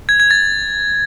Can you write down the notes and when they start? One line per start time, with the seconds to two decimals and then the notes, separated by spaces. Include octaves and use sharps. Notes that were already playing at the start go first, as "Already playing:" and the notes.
0.09 G#6
0.20 G#6
0.31 A6